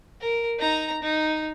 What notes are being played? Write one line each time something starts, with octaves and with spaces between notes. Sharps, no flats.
A#4
D#4 A#5
D#4